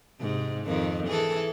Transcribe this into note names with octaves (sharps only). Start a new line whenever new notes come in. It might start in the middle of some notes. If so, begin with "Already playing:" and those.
G#2 C3
F2 D#3
E3 G#4 A4